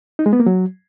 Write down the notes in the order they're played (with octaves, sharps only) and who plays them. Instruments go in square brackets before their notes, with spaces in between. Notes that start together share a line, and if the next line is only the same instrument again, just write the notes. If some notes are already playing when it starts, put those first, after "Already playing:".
[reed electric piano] D#4
G#3
B3
A#3
F#3